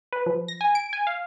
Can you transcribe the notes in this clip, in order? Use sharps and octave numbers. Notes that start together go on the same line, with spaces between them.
B4
F3
A#6
G#5
D7
G#5
F5